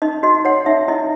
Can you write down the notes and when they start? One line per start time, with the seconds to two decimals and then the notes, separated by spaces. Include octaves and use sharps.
0.02 D#4 D#5
0.23 F#4 D#5
0.45 C#5 F#5
0.66 D#4 E5
0.88 E4 D#5